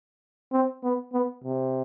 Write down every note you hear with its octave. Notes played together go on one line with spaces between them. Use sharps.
C4
B3
B3
C3